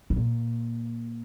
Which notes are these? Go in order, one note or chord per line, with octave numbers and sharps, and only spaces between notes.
A2
A#2